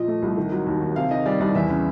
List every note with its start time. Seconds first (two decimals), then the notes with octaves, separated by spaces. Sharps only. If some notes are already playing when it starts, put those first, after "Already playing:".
Already playing: A#2 F3 D#5
0.08 A3
0.22 C2
0.37 D#3
0.52 F#3
0.67 D#2
0.82 D#2
0.96 C3 F5
1.11 D#3 D#5
1.26 G3 D5
1.40 C2 D5
1.55 E2 E5
1.70 C#3